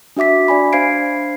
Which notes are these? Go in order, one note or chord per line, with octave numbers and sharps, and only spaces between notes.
D4 F#4 E5 D6 B6
D4 D5 G#5 B5
D4 C5 F5 G#6 C7 D7